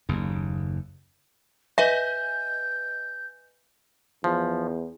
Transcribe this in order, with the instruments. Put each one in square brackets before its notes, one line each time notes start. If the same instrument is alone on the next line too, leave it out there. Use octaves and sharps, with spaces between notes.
[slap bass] F#1 D#2
[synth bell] B4 D#5 G#5 [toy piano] E5 [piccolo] G6
[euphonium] E2 [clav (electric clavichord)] F3